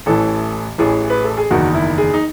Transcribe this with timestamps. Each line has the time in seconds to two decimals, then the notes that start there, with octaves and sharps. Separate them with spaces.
0.06 A1 A2 E3 A4
0.78 A1 A2 E3 G#4
1.10 B4
1.24 A4
1.38 G#4
1.51 F#1 E2 D#3 F#4
1.75 E4
1.98 G#4
2.14 D#4